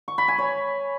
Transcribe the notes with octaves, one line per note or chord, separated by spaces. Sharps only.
C#6
B5
G#5
C#5